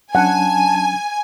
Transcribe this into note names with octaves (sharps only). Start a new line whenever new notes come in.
F#3 C#4 D4 F#5 G#5 A5